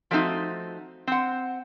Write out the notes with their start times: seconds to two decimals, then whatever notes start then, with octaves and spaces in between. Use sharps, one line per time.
0.11 F3 F#3 A3 C4 D#4 F#4
1.07 C4 F#5